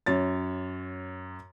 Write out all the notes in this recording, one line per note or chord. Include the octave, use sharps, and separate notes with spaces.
F#2 C#5 A6